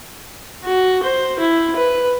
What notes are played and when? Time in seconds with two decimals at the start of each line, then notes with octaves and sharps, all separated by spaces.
0.64 F#4
1.03 C5
1.39 E4
1.76 B4